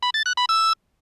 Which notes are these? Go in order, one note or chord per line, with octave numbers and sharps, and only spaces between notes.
B5
A6
F#6
B5
E6